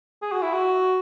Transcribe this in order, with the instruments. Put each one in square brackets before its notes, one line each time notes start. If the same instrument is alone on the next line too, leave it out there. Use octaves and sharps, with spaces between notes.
[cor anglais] G#4
F#4
E4
F#4